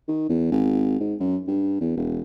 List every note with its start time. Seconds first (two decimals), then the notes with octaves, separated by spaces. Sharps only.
0.08 D#3
0.29 E2
0.52 G#1
1.00 G#2
1.20 F#2
1.48 G2
1.81 E2
1.97 E1